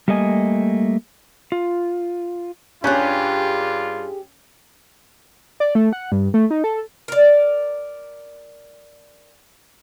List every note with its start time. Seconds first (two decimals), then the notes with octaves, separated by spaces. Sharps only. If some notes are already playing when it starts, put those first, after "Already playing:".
0.08 G3 A3 A#3 D#5 G#5
1.52 F4
2.84 G2 C#4 D4 F4 G4 G#4 F#6
5.60 D5
5.75 A3
5.93 F#5
6.12 G2
6.34 A3
6.51 D#4
6.64 A4
7.08 A#4 D5